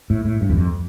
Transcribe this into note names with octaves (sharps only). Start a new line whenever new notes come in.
A2
A2
G2
E2
F2